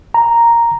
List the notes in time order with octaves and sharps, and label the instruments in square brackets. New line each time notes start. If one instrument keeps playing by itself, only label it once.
[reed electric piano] A#5